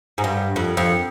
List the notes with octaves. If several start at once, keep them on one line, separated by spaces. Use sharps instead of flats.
G#2
G2
F2
F2